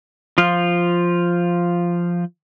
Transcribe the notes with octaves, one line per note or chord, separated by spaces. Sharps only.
F3 F4